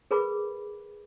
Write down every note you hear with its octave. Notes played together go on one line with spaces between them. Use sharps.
G#4 A#4 B4 B5 D6